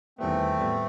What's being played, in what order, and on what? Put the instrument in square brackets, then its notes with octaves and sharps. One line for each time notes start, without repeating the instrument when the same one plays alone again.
[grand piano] E2 D#3 G3 B3 [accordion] A3 C4
[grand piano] A2 G3 B3